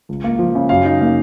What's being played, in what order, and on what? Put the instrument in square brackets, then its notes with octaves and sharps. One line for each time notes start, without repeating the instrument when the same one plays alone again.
[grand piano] C#2
A#3
F3
C#3
F#2 F5
D#4
A#3